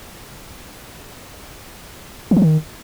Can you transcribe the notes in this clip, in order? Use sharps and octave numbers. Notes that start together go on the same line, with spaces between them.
E3
F3
D#3